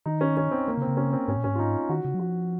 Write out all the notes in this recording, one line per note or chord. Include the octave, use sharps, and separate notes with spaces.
D#3 D#4
C#4
C#4
C4
A#3
C#3
C4
C#3
C#4
C4
G#2 C#4
A#2
G#2 C#4
F4
D#4
D#3 F#4
C#3
F#3
F3 F#4